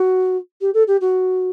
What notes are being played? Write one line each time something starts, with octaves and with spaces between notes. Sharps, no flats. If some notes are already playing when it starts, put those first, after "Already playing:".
Already playing: F#4
G4
A4
G4
F#4